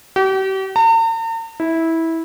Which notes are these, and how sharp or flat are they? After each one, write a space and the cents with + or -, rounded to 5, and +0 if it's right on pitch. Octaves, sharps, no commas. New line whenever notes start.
G4 -40
A#5 -45
E4 -15